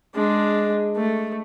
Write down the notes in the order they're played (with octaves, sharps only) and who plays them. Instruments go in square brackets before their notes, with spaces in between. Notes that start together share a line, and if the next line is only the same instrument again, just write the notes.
[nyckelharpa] G#3 D4
A3